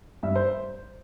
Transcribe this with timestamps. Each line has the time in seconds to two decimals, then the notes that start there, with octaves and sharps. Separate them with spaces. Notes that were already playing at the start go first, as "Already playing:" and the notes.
0.23 G2 E5
0.35 C5